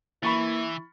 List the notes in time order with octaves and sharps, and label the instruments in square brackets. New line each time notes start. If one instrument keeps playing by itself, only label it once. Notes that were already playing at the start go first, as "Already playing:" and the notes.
[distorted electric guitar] E3 [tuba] A#3 [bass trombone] E4 [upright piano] B5 C#6 A6